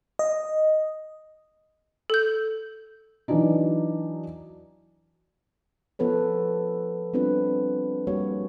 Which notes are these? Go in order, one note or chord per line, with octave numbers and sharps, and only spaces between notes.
D#5
A4 G6
E3 F#3 D4 D#4
F3 B3 A4 B4 C#5
G3 B3 C4 D4 F4 B4
F3 G3 A#3 F#4 C#5